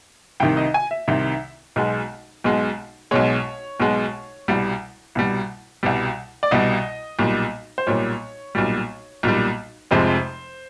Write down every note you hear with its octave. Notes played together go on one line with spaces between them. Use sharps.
C2 C3 D#3 G5
D#5
G#5
E5
C2 C3 D#3
B1 B2 G#3
B1 B2 G#3
B1 B2 G#3 C#5
B1 B2 G#3
C2 B2 G3
C2 B2 G3
C2 B2 G3
D5
C2 B2 G3 D#5
B1 A#2 G3
C5
B1 A#2 G3 C#5
B1 A#2 G3
B1 A#2 G3
F1 F2 C3 F3 G#3 C5